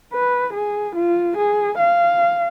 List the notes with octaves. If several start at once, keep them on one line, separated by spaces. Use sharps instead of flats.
B4
G#4
F4
G#4
F5